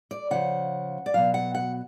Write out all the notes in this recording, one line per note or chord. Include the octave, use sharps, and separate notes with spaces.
D5
C#3 F3 F#5
D5
B2 F#3 F5
F#5
F#5